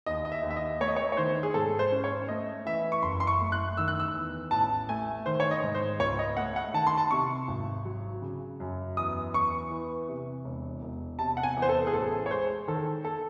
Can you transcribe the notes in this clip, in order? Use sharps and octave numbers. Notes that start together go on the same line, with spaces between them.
D#2 D#5
D#5
E5
D#2
E5
D#5
A3 C#5
D#5
C#5
C#5
D#3 C5
G#4
G#2 A4
C5
C#4
C#5
A3 D#5
E3 E5
C#6
F#1 C6
C6
C#6
A3
F#6
D#3 E6
F#6
E6
E2
A1 A5
A3 G#5
D#3 C5
C#5
D#5
G#2
C5
C#2 C#5
D#5
A3 F#5
F#5
D#3 A5
C6
A5
C3 C#6
G#1
F#3
C#3
F#2
E2 D#6
E2 C#6
E3
C3
E1
E1
C3 A5
F#5
G#5
E2
C5
A4
G#4
A1 A4
C#5
G#3 C5
D#3 A4
A4